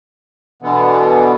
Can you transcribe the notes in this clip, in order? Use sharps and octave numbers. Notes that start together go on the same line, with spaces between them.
B2 D3 E3 B3